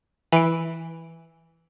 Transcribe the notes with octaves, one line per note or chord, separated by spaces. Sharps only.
E3 D7